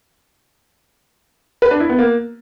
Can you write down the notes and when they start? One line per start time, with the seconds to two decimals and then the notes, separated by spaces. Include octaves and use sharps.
1.62 B4
1.71 D4
1.80 E4
1.89 B3
1.99 A#3